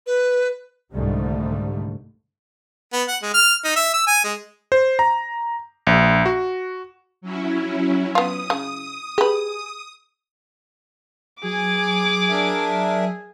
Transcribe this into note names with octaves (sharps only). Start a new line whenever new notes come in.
B4
C2 G#2 D3 D#3 G3 A3
B3
F#5
G#3
F6
D#4
E5
E6
G#5
G#3
C5
A#5
A#1
F#4
F#3 C#4 E4
B3 F4 D#6
C#3
G4 G#4 B4
F#3 G#4 G#5 D6
D4 A#4 E5